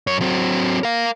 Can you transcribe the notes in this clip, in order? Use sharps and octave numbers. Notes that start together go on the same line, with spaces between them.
F#2 C#5
F#3 C4
A#4 F5